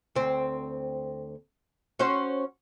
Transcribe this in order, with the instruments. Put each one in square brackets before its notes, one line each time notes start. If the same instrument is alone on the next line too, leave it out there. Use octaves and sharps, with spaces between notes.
[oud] D2 C4
C#4 F#4 C5